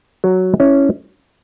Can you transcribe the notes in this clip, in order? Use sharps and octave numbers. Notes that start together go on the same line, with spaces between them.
F#3
C#4 E4